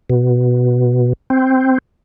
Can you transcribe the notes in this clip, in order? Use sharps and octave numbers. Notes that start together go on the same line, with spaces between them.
B2
C4